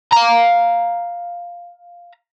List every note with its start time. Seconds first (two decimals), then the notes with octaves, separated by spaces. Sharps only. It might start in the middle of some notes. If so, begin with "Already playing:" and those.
0.12 F5 A#5